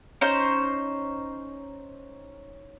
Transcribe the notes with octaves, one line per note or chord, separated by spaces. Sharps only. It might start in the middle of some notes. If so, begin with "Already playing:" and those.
C#4 D#4 C5